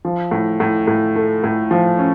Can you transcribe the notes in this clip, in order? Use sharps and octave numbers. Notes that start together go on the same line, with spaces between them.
F3
A2
A2
A2
A3
A2
F3
C#4